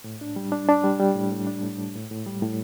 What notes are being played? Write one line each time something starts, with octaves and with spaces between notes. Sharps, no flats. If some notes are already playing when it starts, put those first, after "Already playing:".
A2
D4
G3
D4
D4
G3
G3
A2
A2
D4
A2
A2
A2
A2
G3
A2